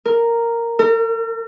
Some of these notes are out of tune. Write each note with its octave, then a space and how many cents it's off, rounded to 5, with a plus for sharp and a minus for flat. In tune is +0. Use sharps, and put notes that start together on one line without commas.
A#4 -5
A#4 -45